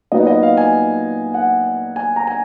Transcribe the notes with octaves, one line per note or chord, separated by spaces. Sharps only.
A#2 F#3 B3 D#4 D#5
D#5
F5
G#5
F#5
G#5
A#5
G#5